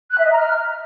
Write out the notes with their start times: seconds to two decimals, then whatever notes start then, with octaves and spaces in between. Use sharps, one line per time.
0.12 F#6
0.18 E5
0.25 D#5
0.32 A#5
0.38 F6